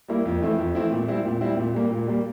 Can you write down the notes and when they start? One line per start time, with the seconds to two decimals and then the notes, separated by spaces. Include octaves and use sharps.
0.08 G3 A#3 E4
0.26 F2
0.42 E3 A3 C4 E4
0.58 F2
0.75 E3 A3 C4 E4
0.92 A#2
1.08 G3 C4 E4
1.25 A#2
1.41 G3 C4 E4
1.57 A#2
1.74 G3 A#3
1.91 A#2
2.07 G3 A#3